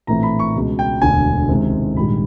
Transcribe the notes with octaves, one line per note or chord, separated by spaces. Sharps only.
A#1 A2 E3 A3 C4 A#5
B5
C#6
C#2 B2 G#3
G5
E1 D2 D3 G#5
C#2 C3 D#3 G#3 C4
A#1 G#2 D#3 G3 B5